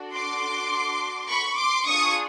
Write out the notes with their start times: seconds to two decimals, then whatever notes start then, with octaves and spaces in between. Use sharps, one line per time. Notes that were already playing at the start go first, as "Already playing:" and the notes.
Already playing: D4 F#4 A4
0.12 C6 D6
1.29 B5 C#6
1.57 C6 D6
1.87 D4 F4 G#4 C#6 D#6